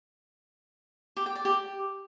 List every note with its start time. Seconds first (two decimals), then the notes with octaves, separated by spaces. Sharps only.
1.17 G4
1.26 G5
1.35 D5
1.45 G4